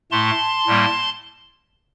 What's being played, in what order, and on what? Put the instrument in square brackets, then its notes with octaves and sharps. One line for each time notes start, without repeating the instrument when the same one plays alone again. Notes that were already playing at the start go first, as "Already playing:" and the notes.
[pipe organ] A2 A3 A5 C6
A2 G3 A#3